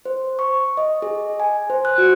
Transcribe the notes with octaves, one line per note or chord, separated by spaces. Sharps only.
C5
C#6
D#5
G#4
G#5
C5
F#6
F#4